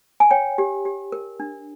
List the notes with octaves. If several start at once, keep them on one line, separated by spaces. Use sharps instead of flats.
G#5
C#5 G5
G4
G4
A#4
D4